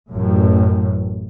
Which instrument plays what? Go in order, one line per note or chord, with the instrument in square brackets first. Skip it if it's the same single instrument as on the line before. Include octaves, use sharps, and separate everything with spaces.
[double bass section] A1 F#2 A2